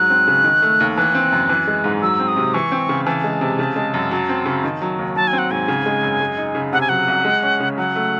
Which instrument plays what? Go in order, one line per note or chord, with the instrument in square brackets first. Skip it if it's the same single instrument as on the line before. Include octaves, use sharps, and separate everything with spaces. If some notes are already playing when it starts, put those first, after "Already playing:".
Already playing: [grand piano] G#2 F#3 [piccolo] F#6
[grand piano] C4
C#3
D#3
A3
D#2
[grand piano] E3 [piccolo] F#6
[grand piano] C4
F#2
E3
G#3
G#2
[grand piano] F#3 [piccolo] E6
[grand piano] C4
[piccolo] D#6
[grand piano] C3
[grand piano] E3 [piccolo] C#6
[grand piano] C4
C#3
[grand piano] E3 [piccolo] A5
[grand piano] G#3
C3
C#3
G#3
F#2
F#3
C4
C#3
D#3
F#3
D#2
[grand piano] F#3 [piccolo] A5
[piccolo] G#5
[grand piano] C4
[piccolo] F#5
[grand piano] G#2 [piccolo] G#5
[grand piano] C#3
G#3
F#2
G#3
D#4
C#3
[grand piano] C3 [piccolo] F#5
[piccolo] G#5
[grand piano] F#3 [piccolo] F#5
[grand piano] C2
G#3
C#4
C#3
[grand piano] F#3 [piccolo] F#5
[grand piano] A3